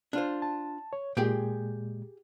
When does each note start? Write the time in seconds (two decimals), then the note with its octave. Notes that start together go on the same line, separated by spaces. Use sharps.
0.13 D4 F4 C5
0.42 A5
0.93 C#5
1.17 A#2 G#3 G4 G#4 G5